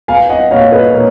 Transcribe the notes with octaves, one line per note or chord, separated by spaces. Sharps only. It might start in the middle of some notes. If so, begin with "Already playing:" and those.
B3 F5 G#5
D#5 F#5
A#2 C#5 F5
B4 D#5
A#2 A#4 C#5